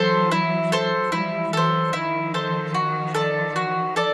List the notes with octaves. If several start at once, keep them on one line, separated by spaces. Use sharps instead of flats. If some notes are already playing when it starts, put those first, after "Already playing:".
Already playing: E3 F#3 A4 C5
E4
A4 C5
F3 G3 E4
E3 F#3 A4 C5
D#3 F3 E4
A4 C5
F#4
A4 D5
F#4
A4 D5